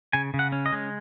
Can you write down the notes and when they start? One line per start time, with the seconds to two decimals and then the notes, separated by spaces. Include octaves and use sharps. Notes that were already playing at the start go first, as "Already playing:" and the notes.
0.13 C#3 G#5
0.34 C#3
0.39 F#5
0.52 C#4
0.66 D#5
0.73 G#3